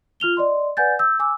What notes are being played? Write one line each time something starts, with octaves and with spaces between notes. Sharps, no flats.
F4 F6 F7 G7
D5 D#5 C6
B4 D5 F#5 G#5 G6 A6
E6 G6
G#5 D6 E6